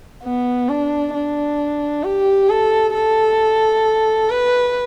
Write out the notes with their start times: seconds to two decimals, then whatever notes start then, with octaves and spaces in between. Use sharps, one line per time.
0.24 B3
0.69 D4
1.14 D4
2.04 G4
2.49 A4
2.94 A4
4.30 B4